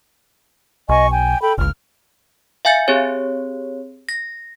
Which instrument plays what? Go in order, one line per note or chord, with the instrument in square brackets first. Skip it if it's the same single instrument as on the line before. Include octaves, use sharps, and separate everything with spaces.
[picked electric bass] B1 [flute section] D#5 G#5 C#6
[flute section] G5 G#5
A4 G5 B5
[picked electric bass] G1 C#2 [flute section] F6
[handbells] E5 F5 G#5 G6 A6 C#7
C4 G4 G#4 C#5
A#6